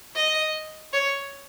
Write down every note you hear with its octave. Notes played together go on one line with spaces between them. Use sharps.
D#5
C#5